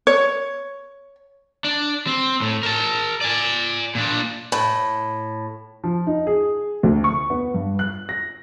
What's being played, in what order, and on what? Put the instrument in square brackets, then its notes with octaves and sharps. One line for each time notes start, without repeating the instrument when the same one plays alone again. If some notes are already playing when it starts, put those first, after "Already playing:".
[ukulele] C#5
[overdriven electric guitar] D4
C4
A2
A#4 A5
D5 G#5
A#2 D4
[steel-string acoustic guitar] A2
[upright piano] F3
D#4
G#4
D2
C#6
B3
G2
F#6
A#6